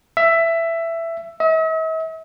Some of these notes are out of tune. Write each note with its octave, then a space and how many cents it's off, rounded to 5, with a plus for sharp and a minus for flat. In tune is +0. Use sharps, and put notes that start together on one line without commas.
E5 +15
E5 -45